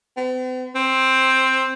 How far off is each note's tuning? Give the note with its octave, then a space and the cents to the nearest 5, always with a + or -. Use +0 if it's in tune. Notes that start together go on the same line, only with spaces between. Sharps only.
C4 -45
C4 +5